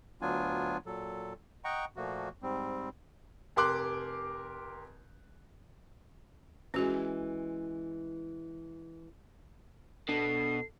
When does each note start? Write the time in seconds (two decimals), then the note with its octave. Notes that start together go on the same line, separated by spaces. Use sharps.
0.22 D2 F#3 B3 D4 F4 G#5
0.86 A#2 F#3 A4
1.64 D#5 F#5 G5 A#5 C#6
1.96 A#2 F3 A3 A#3 F#4
2.42 G#2 G3 C4
3.56 F1 G4 A#4 C6 D6 F#6
6.74 E3 G#3 C#4 F#4
10.09 B2 D4 A4 C7